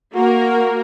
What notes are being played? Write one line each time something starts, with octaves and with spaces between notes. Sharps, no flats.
A#3 F#4 A#4